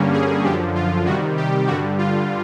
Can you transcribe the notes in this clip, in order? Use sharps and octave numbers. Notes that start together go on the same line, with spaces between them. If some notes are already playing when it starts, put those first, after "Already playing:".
Already playing: G2 D3 G3 A#3 C#4
G#4
F#2 D3 F3 G4
F4
C3 D#3 G3 F#4
G4
G2 D3 G3 F#4
F4